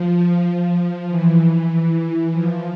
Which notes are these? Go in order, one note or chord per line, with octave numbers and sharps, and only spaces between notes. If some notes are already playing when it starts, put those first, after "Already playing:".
Already playing: F3
F3
F3
E3
F3